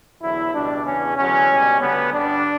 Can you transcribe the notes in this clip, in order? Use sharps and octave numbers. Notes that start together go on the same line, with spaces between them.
E2 D3 F#3 E4
C#2 B2 G3 D4
E2 C#3 E3 C#4
E2 D3 F#3 C#4
C#2 B2 G3
D2 D3 G3 B3
G2 D3 G3 D4